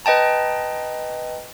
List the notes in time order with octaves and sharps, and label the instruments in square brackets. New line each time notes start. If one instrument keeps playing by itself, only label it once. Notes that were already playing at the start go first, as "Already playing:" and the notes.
[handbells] B4 D#5 G5 A5 A#5